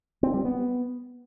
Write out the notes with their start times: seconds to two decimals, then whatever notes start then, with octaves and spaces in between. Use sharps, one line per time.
0.23 C4
0.34 G3
0.45 B3